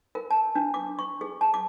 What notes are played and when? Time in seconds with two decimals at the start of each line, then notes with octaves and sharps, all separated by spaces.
0.15 A#4
0.31 A5
0.55 D4
0.74 D6
0.99 C#6
1.21 G#4
1.41 A5
1.54 D6